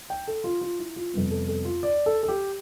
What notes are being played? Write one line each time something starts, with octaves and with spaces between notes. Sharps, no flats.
G5
A4
F4
F4
E4
F4
F2 C3 G3 B3
A4
A4
F4
D5
A4
A4
G4